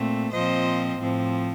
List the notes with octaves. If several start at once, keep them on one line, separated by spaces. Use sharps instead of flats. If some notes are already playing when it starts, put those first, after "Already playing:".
Already playing: A#2 A3 C4
A#2 F3 C4 C5 D#5
A2 F3 C4